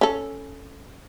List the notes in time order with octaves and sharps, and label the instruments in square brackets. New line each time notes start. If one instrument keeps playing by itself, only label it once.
[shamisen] C#4 A4